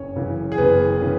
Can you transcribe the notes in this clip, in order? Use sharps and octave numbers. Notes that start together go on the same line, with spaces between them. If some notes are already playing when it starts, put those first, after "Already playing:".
Already playing: F#1 C#4 C#5
F#2 C#3 E3
G#4
F#1 B3 B4
C#3 E3